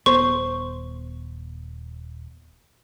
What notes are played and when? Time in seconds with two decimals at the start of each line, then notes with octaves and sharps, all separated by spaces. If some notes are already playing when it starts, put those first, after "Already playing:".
0.06 D#1 B3 C5 C#6